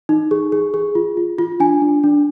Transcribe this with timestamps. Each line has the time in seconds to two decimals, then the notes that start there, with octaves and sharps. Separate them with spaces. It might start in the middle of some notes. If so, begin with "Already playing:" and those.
0.09 D#4
0.31 G#4
0.52 G#4
0.74 G#4
0.95 F4
1.17 F4
1.39 F4
1.60 D4 G#5
1.82 D4
2.04 D4